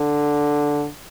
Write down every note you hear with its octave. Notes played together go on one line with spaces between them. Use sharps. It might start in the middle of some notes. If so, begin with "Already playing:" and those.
Already playing: D3